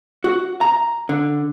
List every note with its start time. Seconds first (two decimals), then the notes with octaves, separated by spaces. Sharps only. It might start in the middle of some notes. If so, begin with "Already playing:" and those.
0.24 F#4
0.61 A#5
1.09 D3